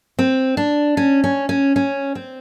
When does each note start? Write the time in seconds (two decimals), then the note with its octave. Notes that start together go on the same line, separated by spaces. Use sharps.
0.19 C4
0.57 D4
0.97 C#4
1.24 C#4
1.49 C#4
1.76 C#4
2.15 C4